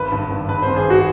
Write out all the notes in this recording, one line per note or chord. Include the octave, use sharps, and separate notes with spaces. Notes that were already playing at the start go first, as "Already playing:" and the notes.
Already playing: G#1 B4
G2
G#1
G2 B4
C5
G#1
G#4
G#1 F#4